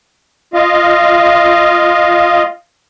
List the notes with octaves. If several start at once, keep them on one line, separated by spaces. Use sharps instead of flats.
F4 D#5 F5